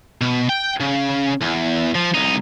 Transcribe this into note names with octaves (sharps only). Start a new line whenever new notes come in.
B2
G5
C#3
E2
F3
C2 D#4